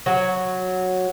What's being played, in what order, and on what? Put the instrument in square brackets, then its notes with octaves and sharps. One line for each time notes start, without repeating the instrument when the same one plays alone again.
[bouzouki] F#3